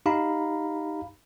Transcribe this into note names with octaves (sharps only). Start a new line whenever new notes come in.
D#4 G4 F5 A#5 B5